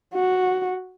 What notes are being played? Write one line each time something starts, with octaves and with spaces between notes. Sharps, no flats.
F#4